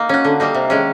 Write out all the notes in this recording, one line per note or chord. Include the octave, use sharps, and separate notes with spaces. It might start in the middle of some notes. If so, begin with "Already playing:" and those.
Already playing: A#3 D#4
C#4 F#4
D3
G3 A#3 D#4
C3
D#3 G#3 C#4